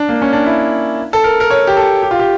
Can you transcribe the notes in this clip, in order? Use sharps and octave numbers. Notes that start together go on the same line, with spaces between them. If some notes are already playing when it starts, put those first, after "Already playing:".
Already playing: D4
A#3
C#4
D4
E4
A4
A#4
A#4
C#5
G4
A4
G4
F4
G4